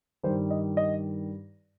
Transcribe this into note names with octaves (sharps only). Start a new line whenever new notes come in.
G2 D#3 G3 C5
D#5
D#5